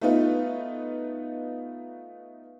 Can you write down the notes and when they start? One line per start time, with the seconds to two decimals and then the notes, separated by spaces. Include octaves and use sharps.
0.01 A3 B3 D#4 F4 B4